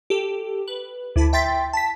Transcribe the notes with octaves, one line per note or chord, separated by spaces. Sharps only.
G4 A4
B4
D2 E4 A5 B5
E5 G5 C6 A6 B6
A5 B6